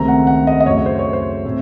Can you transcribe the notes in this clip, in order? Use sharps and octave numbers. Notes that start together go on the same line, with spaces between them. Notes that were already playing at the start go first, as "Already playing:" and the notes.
Already playing: C#2 C3 D#3 A3 C4 A#5
F#5
F#5
D#5
D#5
F#2 C#3 A3 C#5
C5
C#5
C5
A2 A3 C4